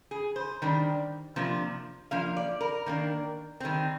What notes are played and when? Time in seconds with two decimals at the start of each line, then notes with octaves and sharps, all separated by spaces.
0.11 G#4
0.36 C5
0.62 D#3 G3 D4
1.36 C3 F3 A#3 D4
2.11 F3 A#3 D4 F5
2.37 D5
2.61 A#4
2.86 D#3 A#3 D4
3.60 D#3 G3 C4